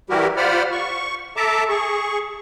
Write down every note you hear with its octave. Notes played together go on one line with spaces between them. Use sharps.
E3 G3 E4 F#4 G4 A#4
F4 C5 D5 F#5 B5 F6
C#6
A4 E5 A5 A#5 D6
G#4 C#6